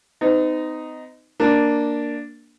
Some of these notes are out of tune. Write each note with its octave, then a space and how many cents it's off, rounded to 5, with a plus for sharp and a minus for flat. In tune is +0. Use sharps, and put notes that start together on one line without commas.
C4 -45 D#4 +0
A#3 +0 D4 +0